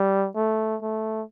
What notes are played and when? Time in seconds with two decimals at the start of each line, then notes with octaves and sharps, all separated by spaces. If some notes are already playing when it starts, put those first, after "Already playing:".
Already playing: G3
0.36 A3
0.82 A3